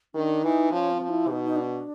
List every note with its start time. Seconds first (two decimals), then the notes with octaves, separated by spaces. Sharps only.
0.14 D#3 D4
0.43 E3 D#4
0.71 F3 C#4
0.91 C4
1.00 F3
1.09 E4
1.28 B2 D#4
1.44 D#4
1.56 D4